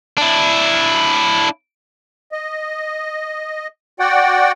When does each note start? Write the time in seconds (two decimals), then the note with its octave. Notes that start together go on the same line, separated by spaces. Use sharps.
0.18 D4 E4
2.32 D#5
4.00 F#4 D5 F#5 G5